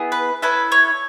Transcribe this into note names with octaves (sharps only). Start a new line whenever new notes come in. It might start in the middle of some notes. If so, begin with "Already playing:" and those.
Already playing: B3 E4 G#4
B4
C#4 E4 A4 B4
C#5